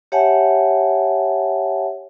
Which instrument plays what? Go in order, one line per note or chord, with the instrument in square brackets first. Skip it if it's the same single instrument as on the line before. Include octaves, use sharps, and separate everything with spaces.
[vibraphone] G4 C#5 E5 F#5 G#5 A5